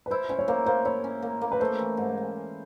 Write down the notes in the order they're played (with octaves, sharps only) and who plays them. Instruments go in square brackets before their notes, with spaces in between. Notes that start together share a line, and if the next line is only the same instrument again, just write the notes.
[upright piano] B4
[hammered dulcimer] E4 [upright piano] C5
[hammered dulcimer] C#4 [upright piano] C5
[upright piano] C#5
[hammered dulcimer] A#3 [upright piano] C5
[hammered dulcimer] A#3 [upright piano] C5
[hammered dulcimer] E4 [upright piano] C#5
[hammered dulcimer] C#4
A#3
A#3
[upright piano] B4
[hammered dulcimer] A3 [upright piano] C5
[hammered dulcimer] E3
G#2